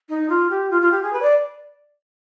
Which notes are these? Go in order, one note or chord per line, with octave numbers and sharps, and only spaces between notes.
D#4
F4
G4
F4
F4
G4
G#4
B4
D5